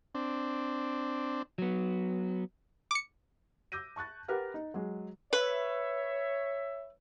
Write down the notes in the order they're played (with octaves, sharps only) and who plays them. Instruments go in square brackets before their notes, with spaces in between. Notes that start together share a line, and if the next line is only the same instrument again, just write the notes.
[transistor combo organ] C4 D4
[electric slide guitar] F#3 B3
[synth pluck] D6 C#7
[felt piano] D6 E6 G6 A#6 D#7
A5 C#6 F#6 A6
G4 A#4 B4 F#5 F6
D#4
F#3 G#3
[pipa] B4 [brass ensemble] C#5 E5